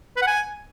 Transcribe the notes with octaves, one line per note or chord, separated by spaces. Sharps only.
B4
F#5
G#5